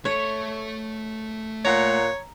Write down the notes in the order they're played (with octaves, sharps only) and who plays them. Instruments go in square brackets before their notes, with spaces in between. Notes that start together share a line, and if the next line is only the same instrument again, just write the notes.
[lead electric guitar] A3 A4 [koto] C#5
[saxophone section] A#2 F#5 [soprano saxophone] C#5 [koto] A#5